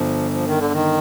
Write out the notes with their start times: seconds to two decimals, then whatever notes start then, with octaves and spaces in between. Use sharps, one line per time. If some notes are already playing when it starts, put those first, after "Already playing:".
Already playing: G1 F3
0.31 F3
0.45 D#3
0.59 D3
0.73 D#3